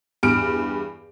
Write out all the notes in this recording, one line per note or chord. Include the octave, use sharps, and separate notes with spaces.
E2 G2 F6 D7